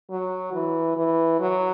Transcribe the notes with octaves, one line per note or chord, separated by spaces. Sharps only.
F#3
E3
E3
F#3